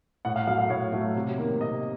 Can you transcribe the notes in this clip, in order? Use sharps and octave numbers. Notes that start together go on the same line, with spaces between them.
A2 F#5
F5
F#3 A3 F5
F5
A2 C#5
F#3 A3
C3
D#3 A#3
C3 D#5